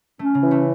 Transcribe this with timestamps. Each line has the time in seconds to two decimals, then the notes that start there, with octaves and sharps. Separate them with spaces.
0.19 A3 C#4
0.35 C#3
0.43 E3
0.51 A3